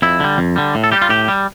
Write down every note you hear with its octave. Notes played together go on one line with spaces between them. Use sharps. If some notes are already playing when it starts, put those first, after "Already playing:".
F2 E4
D3 G3
F2
D3 G3
A2
A4
G3 G4
F4
A2 G4
G3